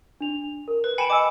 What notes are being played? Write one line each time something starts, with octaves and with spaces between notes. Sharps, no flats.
D4 F7
A#4
B4
G5 G#5 B5 C#7 E7
D#5 G#5 D6 E6